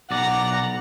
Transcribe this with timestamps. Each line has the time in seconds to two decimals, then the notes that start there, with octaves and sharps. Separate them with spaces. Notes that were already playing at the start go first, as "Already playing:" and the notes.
0.11 B1 D5 F#5 A#5